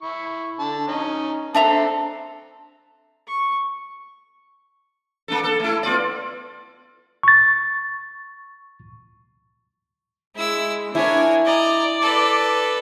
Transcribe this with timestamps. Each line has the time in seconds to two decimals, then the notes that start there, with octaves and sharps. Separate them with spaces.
0.02 E4 C#6
0.60 D3 A5
0.88 C#4 D#4
1.54 C4 D4 A4 E5 A#5
3.27 C#6
5.28 A#3 D4 A4
5.44 A4
5.60 A3 E4
5.83 B3 F4 D5
7.23 C#6 A6
10.36 G#3 E4 E6
10.95 D4 E4 A#4 C#5 G#5
11.46 D5 D#5 A#5
12.02 A4 B4